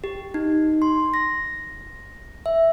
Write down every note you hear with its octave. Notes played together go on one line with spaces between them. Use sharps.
G4
D#4
C6
A#6
E5